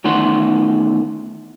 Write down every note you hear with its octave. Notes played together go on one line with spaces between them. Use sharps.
E2 D#3 A3 C#4 F#5 C6